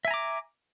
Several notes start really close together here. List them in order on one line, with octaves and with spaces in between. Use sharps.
E5 G#5 A#5 D6